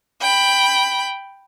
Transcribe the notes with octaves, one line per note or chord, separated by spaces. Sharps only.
G5 B5